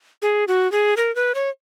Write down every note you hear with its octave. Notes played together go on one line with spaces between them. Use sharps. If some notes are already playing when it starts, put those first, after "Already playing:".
G#4
F#4
G#4
A#4
B4
C#5